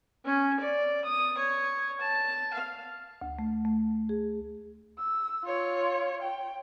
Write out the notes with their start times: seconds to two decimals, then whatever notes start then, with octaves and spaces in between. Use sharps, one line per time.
0.25 C#4
0.60 D5
1.04 D#6
1.37 C#5
2.01 A5
2.53 F5
3.21 D2
3.39 A3
3.65 A3
4.09 G#4
4.99 E6
5.44 F4 C#5
6.23 G5